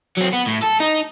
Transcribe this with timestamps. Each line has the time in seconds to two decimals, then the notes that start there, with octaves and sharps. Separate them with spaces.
0.17 F#3 C4
0.33 B3
0.47 A2
0.63 A4
0.80 D#4